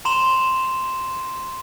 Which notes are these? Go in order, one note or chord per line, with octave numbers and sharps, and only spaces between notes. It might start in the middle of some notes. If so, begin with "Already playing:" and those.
A#5 C6 E7 F7 G7